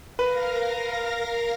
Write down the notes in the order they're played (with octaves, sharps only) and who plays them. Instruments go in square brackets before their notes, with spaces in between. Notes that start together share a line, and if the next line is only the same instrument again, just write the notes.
[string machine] A#4 F5 A#6 [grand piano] B4